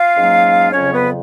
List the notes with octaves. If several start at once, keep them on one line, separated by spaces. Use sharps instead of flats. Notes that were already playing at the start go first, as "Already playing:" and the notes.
Already playing: F4 F5
G#2 F#3 A#3 C#4
F2 C#3 F#3 C#4 C#5
B3 B4